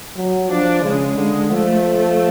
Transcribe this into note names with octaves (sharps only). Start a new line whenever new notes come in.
F#3
F3 D4
C#3 G#3
D3 G#3
F3 A3